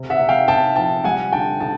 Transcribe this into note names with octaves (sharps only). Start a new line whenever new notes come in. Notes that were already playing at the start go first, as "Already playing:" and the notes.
Already playing: C3
E5 F#5
C3
F5 G5
C3 G5 A5
F3 G5 A5
G3 F#5 G#5
D3 G5 A5
D3 G5 A5